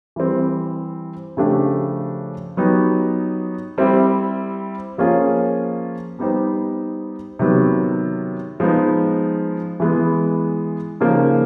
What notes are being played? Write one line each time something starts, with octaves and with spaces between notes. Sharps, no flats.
E3 G3 C4
C#3 F3 A3 D4 G4
F#3 B3 D#4 G4
G3 C4 E4 G4
F3 A#3 C#4 F4 G#4
G3 B3 D#4 G4 C5
C3 D#3 F#3 B3
F3 G#3 B3 D#4
E3 G#3 B3
C#3 F3 A#3 D#4